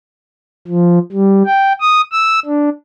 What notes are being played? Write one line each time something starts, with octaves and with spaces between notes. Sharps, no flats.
F3
G3
G5
D#6
E6
D4